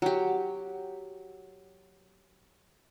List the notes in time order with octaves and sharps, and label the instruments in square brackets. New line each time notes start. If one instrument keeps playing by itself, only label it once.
[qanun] F#3 G4